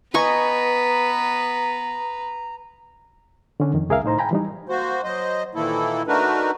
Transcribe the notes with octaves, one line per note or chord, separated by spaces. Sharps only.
B3 B4 D#5 G#5 A#5 C#6
D3 C#4 D4
F2 D#3
C2 G#4 A#4 E5 F5
A2 D#4 C5 A#5
G5 G#5 A#5 B5
E3 G3 D#4
A#3 F#4 C5
F#3 C5 D#5
A#2 D#3 E3 A#3 E4 A4
A3 D4 D#4 F#4 A#4 B4